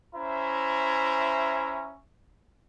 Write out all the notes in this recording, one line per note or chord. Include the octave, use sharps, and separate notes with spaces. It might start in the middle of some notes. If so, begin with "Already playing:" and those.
C#4 E4 C5 E5 A#5